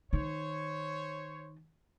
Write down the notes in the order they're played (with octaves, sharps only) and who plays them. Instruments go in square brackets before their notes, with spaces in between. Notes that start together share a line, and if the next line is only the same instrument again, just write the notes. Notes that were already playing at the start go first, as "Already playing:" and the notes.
[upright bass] D#3 [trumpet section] C5 C#5